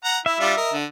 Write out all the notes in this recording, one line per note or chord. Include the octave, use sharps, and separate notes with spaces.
F#5 A#5
E4 E5
G3 D4 F4
A#4 D#5
D3